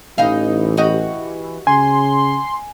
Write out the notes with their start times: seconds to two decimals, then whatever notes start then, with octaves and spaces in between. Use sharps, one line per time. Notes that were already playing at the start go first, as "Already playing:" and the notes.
0.18 A1 E3 D#4 F5
0.77 F#4 G4 D#5
1.67 C#3 G#5 C6